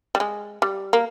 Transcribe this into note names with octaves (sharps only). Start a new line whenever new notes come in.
G3
G#3
G3
A#3